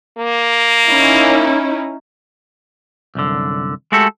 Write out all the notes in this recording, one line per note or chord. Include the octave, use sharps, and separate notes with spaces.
A#3
C#4 D#4 E4
C2 F#2 D3
G#3 A3 F#4 G4 A4